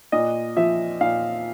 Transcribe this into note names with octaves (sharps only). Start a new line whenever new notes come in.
A#2 D#5
F3 E5
A#2 F5